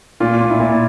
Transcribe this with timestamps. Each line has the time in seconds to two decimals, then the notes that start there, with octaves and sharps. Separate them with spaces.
0.20 A#2 F4
0.41 A#2
0.50 E4
0.60 A#2